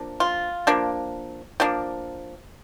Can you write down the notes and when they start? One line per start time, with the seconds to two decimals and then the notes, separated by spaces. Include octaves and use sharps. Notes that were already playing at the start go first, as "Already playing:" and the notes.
Already playing: F3 A#3 D4
0.20 F4
0.67 F3 A#3 D4
1.60 F3 A#3 D4